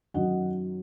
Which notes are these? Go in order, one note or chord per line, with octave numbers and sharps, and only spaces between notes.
F#2 D#3 F#3 D#5 F#5